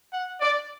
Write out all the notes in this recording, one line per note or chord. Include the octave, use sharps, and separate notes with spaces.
F#5
D5